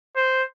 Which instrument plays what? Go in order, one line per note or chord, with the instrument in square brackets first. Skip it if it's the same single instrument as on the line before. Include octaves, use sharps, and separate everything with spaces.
[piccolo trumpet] C5